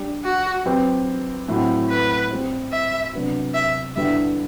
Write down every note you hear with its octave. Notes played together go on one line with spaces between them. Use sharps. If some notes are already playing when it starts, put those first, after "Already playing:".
Already playing: G3 D4 G4
F#4
F#3 C4 G4 B4
A2 F#3 C4 F#4
B4
G3 C4 G4 C5
E5
C3 F#3 B3 D4 F#4
E5
G2 D3 G3 B3 E4 E5